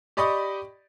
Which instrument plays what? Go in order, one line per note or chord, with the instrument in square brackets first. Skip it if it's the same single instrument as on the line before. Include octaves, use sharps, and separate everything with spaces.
[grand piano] G4 D5 D#5 B5 C#6 D#6